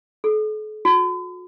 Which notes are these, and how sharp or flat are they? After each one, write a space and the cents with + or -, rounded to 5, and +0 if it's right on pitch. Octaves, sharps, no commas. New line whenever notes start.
A4 -45
F#4 -40